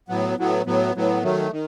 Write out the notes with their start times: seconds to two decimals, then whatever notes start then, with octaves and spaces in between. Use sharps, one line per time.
0.08 A2 F#3 B3
0.37 A2 F#3 B3
0.66 A2 F#3 B3
0.95 A2 F#3 B3
1.23 D#3 F#3 A3
1.52 D#3